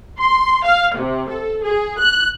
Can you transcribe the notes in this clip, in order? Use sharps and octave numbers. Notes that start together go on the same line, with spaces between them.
C6
F5
C3
A4
G#4
F#6